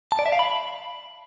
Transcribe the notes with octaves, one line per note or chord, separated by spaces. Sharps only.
A5
D5
E5
F5
B5